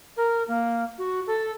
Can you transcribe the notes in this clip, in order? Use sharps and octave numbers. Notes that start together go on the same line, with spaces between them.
A#4
A#3
F#4
A4